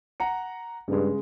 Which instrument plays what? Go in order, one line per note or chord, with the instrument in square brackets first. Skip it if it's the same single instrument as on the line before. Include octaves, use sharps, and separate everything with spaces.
[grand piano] F#5 A#5 C#7
[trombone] G2 [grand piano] C#3 G#3